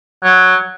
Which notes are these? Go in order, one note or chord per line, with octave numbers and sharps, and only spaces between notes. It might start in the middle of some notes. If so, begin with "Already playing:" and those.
F#3